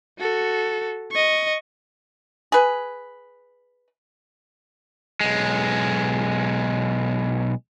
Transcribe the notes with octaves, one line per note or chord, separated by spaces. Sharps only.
F#4 A4
D#5 C#6
G#4 B4
B1 G#3